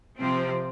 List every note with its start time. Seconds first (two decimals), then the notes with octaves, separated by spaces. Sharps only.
0.17 C3 F3 C4